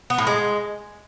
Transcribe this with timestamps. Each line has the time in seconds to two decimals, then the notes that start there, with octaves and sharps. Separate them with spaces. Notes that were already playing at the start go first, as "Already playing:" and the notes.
0.10 B3
0.18 A2
0.27 G#3